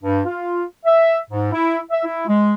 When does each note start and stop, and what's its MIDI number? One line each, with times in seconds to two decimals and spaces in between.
0.03 0.19 43
0.25 0.63 65
0.85 1.16 76
1.29 1.49 44
1.52 1.78 64
1.91 1.99 76
2.04 2.26 64
2.27 2.54 56